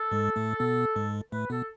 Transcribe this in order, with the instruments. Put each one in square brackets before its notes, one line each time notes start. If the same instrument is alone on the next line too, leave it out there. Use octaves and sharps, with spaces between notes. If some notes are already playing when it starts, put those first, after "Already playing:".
Already playing: [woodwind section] A4
[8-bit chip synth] G#2 G#3
A2 A3
B2 B3
G#2 G#3
[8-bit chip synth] A2 A3 [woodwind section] B4
[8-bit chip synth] B2 B3 [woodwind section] A4